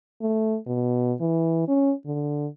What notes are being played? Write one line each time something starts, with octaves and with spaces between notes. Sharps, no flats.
A3
B2
E3
C#4
D3